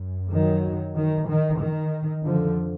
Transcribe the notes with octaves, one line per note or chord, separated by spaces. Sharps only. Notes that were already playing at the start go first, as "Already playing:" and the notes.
Already playing: F#2
D#3 F#3
D#3
D#3
D#3
F2 D3 F3